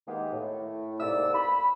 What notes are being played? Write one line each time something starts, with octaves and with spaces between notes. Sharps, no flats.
D#3 G#3 A#3 B3 G4
A2
C2 G#2 G3 A#3 D5 E6
B5